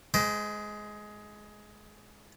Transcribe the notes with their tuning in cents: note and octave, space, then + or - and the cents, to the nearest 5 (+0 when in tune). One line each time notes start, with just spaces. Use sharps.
G#3 +15 C5 -35 G5 +0